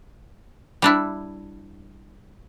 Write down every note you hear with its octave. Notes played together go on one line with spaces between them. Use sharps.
G3 D4 E4